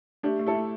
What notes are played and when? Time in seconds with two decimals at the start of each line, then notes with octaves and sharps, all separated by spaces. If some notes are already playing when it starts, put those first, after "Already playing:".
0.23 A3 D4 G4
0.39 A3
0.47 E4 A4
0.55 A3